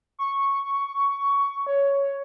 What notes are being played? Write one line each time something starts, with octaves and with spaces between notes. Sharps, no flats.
C#6
C#5